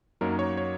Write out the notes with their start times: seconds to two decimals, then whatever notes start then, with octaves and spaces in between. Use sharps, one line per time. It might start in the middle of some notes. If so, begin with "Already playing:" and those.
0.21 F#2 F#3 A#3 D#4 A#4
0.39 C#5
0.57 C#5